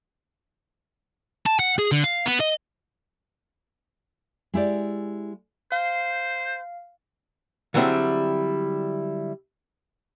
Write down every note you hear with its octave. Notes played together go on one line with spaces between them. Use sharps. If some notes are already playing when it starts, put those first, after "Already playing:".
A5
F#5
G#4
D3
F5
B3
D#5
G#3 E4 G4 D5
C5 F5
D3 F#3 G3 C4 E4 G#4